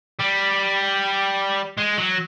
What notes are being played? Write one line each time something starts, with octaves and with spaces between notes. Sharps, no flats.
G3
G#3
F#3